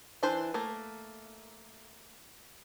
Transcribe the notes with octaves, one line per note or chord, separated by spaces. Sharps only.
E3 D4 E4 B4 C5
A3 A#3